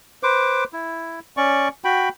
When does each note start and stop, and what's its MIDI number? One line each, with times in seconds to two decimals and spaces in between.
0.23 0.64 71
0.23 0.64 72
0.23 0.64 86
0.73 1.20 64
1.37 1.68 61
1.37 1.68 74
1.37 1.68 85
1.84 2.09 66
1.84 2.09 79
1.84 2.09 83